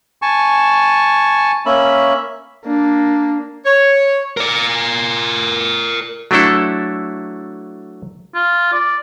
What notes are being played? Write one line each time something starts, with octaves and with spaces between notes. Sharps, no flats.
G#5 A5 C#6
A#3 C#4 E5 B5
A#3 D4
C#5
A#4 D5
F#3 A3 D4 E4 A4
F4
D5